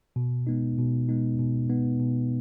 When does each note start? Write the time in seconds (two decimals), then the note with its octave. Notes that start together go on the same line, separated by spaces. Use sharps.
0.16 B2
0.47 G#3 B3 D#4
0.78 B2
1.09 G#3 B3 D#4
1.39 B2
1.69 G#3 B3 D#4
2.00 B2